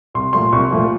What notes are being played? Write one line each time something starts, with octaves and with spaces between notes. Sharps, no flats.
C2 C6
A#2 F3 A3 C6
C2 C#6
A#2 F3 A3